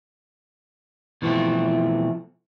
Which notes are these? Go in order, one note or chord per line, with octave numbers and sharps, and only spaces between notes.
B2 E3 F3 A3 C4